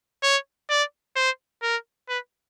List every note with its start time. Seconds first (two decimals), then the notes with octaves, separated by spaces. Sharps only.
0.23 C#5
0.70 D5
1.16 C5
1.63 A#4
2.09 B4